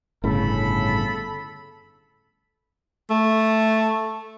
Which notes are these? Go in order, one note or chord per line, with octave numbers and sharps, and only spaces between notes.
G1 A2 C#3 A4 B5
A3